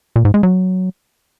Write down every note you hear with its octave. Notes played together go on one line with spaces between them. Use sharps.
A#2
G#2
G#3
F#3